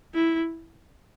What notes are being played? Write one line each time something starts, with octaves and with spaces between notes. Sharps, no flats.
E4